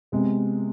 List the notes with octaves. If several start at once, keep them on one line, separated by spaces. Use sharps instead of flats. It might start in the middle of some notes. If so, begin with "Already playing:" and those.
C3 G#3 B3